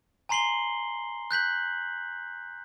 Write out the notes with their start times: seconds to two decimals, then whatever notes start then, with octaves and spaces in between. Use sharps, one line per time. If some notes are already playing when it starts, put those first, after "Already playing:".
0.29 G#5 A#5 C6 C7 F#7 G7
1.31 F#6 G6 B6 F#7